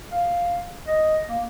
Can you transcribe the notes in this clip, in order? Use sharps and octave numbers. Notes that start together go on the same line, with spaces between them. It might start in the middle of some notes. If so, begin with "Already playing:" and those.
F5
D#5
A#3